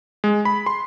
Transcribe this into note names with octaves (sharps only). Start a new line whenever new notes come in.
G#3
B5
C6